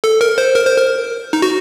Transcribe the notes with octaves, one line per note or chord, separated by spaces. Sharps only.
A4
A#4
C5
A#4
C5
A#4
D#4
F#4